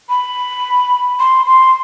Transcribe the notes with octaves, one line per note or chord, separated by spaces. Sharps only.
B5
C6
C6